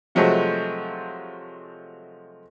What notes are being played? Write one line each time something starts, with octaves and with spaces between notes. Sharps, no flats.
C3 F3 F#3 G#3 A3 F#4